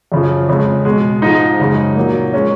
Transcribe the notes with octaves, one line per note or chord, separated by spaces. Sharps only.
F#2 C#3 F3
F2 C#3 G#3
B2 G#3
G#2 F3 G#3 D#4
F#2 C#3 G#3
A#2 F#3 A#3
F3 G#3 C#4